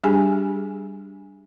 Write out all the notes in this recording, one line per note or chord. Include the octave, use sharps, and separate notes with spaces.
G3 D4 G4 G#4 G#5